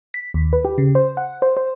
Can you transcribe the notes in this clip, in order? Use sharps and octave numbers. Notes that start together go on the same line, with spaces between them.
B6
D#2
B4
G4
C#3
C5
F#5
C5
C5